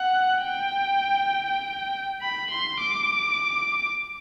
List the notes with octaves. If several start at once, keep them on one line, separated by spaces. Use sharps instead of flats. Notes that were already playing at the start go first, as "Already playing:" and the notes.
Already playing: F#5
G5
B5
C6
D6